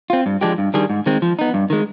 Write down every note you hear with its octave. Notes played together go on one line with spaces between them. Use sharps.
C4 F4
G2
F3 G#3 D4 G4
G2
D#3 G3 D4 G#4
G#2
D#3 G#3 C4
F3
B3 D#4
G2
D#3 G#3